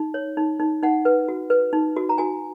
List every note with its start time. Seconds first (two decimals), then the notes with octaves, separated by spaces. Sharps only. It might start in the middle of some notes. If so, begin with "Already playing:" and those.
Already playing: D#4
0.14 C#5
0.37 D#4
0.60 D#4
0.83 D#4 F#5
1.05 B4
1.28 F#4
1.50 B4
1.73 D#4
1.96 F#4
2.09 A#5
2.18 F#4 G#5